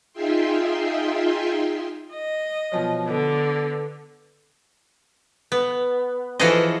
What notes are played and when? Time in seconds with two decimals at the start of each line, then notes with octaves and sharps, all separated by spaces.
0.13 D#4 F4 G#4 E5 G5 C6
2.12 D#5
2.72 B2 F3 F#3
3.07 D3 B3
5.52 B3
6.39 E3 F3 F#4 G#4 A4 D#5